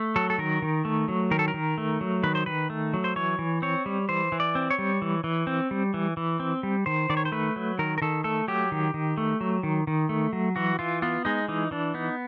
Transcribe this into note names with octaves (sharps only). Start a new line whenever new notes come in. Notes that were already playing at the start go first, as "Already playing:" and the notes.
Already playing: A3
F#3 A4
A4
D#3 A#4
D#3
A3
F#3
D#3 A#4
A4
A#4
D#3
A3
F#3
D#3 B4
C5
D#3 B4
A3
F#3
C5
E3 C#5
E3
C4 C#5
G3
E3 C5
E3
D5
C4
C#5
G3
E3
E3
C4
G3
E3
E3
C4
G3
D#3 C5
D#3 D5
C#5
C5
A3 B4
F#3
D#3 A#4
A#4
D#3 A4
A3 A4
F#3 G4
D#3
D#3
A3
F#3
D#3
D#3
A3
F#3
E3 F#4
E3 F4
B3 F4
G#3 D#4
E3 D#4
E3 D4
B3 D#4